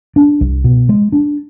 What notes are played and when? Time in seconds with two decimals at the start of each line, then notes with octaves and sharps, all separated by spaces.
0.16 D4
0.41 C2
0.64 B2
0.89 G#3
1.12 D4